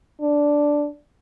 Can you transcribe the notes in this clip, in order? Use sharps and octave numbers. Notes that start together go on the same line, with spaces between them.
D4